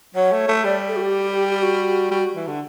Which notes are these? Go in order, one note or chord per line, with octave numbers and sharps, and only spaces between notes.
F#3 C#5
A3
A3
G3 D5
A4
F#4
G4
G4
F#4
G3
E3
D3